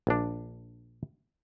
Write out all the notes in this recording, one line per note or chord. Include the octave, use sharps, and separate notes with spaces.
A#1 D4